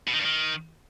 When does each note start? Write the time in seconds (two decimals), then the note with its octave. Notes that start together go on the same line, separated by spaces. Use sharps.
0.08 B2
0.13 D#3
0.19 G2
0.25 D#3